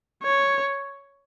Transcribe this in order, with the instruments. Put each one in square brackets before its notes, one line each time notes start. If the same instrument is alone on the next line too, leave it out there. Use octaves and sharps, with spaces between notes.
[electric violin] C#5